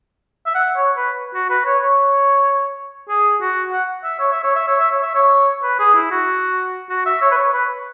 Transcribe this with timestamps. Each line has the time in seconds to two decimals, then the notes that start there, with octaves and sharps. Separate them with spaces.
0.47 E5
0.55 F#5
0.76 C#5
0.97 B4
1.34 F#4
1.50 B4
1.66 C#5
1.82 C#5
3.09 G#4
3.41 F#4
3.73 F#5
4.04 E5
4.20 C#5
4.32 E5
4.44 C#5
4.56 E5
4.68 C#5
4.80 E5
4.91 C#5
5.03 E5
5.15 C#5
5.63 B4
5.79 G#4
5.95 E4
6.11 F#4
6.90 F#4
7.06 E5
7.22 C#5
7.32 B4
7.38 C#5
7.54 B4